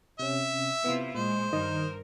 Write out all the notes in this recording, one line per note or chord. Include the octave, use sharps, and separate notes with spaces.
C3 C#4 E5
C3 B3 E4 F4
A#2 G#3 C5
G2 D#3 A#4 D#5 D#6